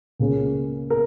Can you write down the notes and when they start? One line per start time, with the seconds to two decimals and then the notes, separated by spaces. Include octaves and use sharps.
0.19 C#2 C#3 A#3 C#4
0.90 A#4